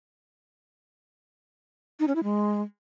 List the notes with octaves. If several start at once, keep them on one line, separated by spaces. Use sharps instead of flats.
D#4
C#4
E4
G#3